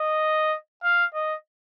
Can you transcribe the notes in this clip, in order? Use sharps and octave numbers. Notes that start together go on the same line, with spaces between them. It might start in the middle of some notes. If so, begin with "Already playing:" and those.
Already playing: D#5
F5
D#5